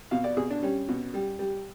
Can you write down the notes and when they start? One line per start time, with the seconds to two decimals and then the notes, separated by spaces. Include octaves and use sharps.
0.11 B2 F5
0.24 D5
0.37 B2 G#4
0.50 D4
0.63 G3 C#4
0.89 B2
1.14 G3
1.39 G3